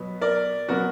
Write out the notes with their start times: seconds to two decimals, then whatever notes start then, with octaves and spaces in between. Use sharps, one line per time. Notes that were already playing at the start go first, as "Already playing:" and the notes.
Already playing: B2 F#3 B3
0.21 A#4 D5
0.69 B2 F#3 B3 F#4 A#4